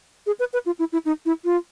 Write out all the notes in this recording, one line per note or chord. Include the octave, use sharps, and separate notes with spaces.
G#4
B4
B4
F4
E4
E4
D#4
E4
F4